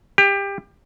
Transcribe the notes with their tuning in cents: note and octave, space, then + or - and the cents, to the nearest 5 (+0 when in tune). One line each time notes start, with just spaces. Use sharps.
G4 +25